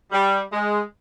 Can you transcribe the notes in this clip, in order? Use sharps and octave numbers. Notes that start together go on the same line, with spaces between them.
G3
G#3